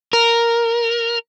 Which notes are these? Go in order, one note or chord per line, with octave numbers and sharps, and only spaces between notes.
A#4